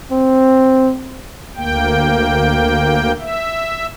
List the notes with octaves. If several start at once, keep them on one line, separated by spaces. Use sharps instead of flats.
C4
D2 A#3 G5
E5